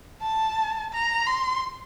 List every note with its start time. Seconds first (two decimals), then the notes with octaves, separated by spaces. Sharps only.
0.21 A5
0.93 A#5
1.27 C6